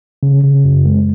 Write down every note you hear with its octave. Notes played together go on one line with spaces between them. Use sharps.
C#3
C#3
F#2
G#3